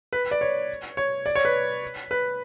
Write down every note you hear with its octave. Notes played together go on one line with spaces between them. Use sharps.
B4
D5
C#5
C#5
D5
C#5
B4
B4